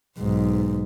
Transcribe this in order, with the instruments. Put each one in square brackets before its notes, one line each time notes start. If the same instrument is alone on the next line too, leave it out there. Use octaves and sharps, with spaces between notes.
[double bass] B1 G#2